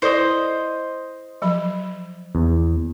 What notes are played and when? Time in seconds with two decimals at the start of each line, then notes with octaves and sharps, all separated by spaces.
0.02 E4 A4 C5 D5 D#5
1.42 F3 F#3 B5
2.35 E2